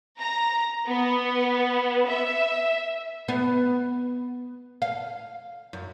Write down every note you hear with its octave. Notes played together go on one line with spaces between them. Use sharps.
A#5
B3
E5
B3
F5
F#2